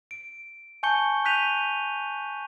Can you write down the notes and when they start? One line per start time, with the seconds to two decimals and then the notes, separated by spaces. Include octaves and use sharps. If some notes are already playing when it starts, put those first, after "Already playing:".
0.11 D7
0.83 G#5 A5 C#6 G6 C#7 G7
1.25 F#6 G6 B6 D#7 F7